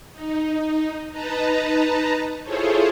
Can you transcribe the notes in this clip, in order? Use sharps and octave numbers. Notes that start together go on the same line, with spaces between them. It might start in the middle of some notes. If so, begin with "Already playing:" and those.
D#4
D#4 B4 D#5 A5 A#5
E4 F4 G#4 A4 C5 C#5